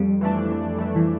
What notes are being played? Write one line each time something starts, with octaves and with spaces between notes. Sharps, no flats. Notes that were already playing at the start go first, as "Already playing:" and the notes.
Already playing: F2 G3
E3 A3 D4
F2
E3 A3 D4
E3